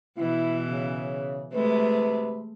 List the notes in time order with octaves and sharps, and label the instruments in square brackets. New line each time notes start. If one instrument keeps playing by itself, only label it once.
[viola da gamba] B2 E3 [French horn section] E4
[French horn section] C#3
[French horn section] D2 C3 B4 [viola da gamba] G#3 A3